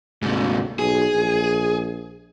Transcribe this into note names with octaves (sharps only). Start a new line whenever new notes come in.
D2 G#2 C3
B1 G#4
A#1